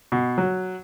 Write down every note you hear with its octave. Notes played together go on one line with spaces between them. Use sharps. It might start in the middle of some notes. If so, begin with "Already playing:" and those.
B2
F#3